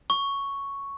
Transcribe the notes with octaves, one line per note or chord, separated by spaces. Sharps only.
C#6